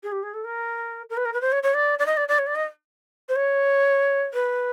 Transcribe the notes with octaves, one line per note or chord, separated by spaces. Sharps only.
G#4
G4
G#4
A4
A#4
A#4
B4
A#4
B4
C5
C#5
C#5
D5
D5
D#5
D5
D5
C#5
D5
D#5
C5
C#5
B4